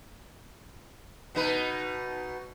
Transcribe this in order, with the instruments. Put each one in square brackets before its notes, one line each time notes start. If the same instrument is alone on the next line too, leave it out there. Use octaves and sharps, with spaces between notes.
[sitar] B2 D#4 B4